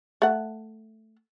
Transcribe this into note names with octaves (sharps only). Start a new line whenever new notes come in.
A3 F#5